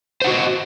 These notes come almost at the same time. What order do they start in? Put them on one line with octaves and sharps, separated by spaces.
C5 F#5 F#4 D#5